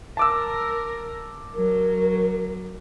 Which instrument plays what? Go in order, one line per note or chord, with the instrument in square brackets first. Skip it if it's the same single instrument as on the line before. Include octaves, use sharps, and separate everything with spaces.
[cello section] A#4 [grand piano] A5 D6 E6
[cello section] F#3 [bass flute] A#4